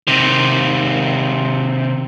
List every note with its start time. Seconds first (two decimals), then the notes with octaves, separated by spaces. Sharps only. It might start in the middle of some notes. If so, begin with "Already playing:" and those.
0.07 C3 D#3